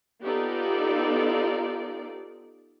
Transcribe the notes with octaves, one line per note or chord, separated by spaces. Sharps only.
B3 D#4 F4 G4 A4 D5